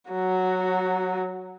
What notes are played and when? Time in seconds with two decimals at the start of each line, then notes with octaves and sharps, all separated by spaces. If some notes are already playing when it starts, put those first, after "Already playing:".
0.10 F#3 F#4